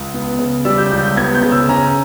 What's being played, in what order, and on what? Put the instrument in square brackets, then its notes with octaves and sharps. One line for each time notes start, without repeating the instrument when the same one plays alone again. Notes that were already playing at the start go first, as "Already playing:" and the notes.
Already playing: [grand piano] C#2
B3
C#3
[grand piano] G3 [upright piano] E6
[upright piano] G6
[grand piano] C#2 [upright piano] G6
[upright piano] G6
[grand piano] B3 [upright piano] G#6
[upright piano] G6
[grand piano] C#3
[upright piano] E6
[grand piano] C#4 [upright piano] A#5